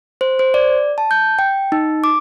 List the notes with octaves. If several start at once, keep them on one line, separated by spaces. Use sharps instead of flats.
C5
C5
D5
A5
G6
G5
D#4
D6